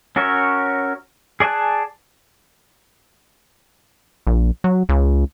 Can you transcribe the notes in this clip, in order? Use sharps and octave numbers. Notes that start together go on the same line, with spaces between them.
C#4 F#4 A#4 C#5 E5
G#4 D5 G#5 A5 F#6
A#1
F#3
C#2